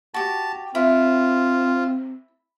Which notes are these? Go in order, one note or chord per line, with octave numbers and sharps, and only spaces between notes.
F#4 G4 A5
C4 E4 F4